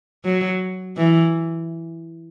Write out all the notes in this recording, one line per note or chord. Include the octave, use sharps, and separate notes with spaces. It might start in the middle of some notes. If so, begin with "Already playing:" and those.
F#3
E3